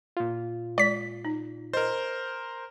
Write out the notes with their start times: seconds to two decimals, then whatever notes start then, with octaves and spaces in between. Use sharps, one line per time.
0.17 A#2 F4
0.78 G#3 D5 B6
1.25 D#4
1.73 A#4 C5 D#5